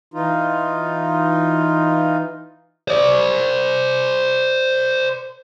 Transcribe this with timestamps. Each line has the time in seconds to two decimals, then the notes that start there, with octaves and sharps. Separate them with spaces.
0.14 E3 D#4 F4
2.88 C5 D5